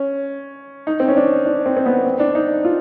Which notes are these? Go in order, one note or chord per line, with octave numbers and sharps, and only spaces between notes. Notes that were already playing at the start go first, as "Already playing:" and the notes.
Already playing: C#4
D#4
C4
C#4
D4
D4
C4
C4
B3
C4
D4
D#4
F4